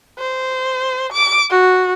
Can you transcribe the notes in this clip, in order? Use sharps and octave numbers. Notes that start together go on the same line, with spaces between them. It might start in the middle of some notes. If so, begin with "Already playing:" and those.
C5
D6
F#4